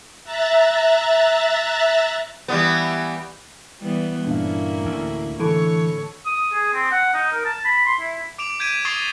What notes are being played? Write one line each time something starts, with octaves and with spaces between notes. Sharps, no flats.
E5 A#5 F#6 A6
E3 G3 B3
E3 G3 B3
G2 A#2 A#3 C#4 D4 E4 F5
D2 A2
D3 E3 A4 C#5
D#6
G#4
C4
F#5
D#4
A#4
A5
B5
C6
E4
D6 D7 E7 F7
G6 G#6 B6 D7 D#7
C#6 D#6 A6 C7 G7